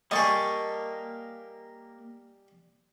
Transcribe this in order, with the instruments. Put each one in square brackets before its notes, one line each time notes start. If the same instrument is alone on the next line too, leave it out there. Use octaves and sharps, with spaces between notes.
[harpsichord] G3 G#4 [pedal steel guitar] A#3 [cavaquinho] D#5 A5 C#6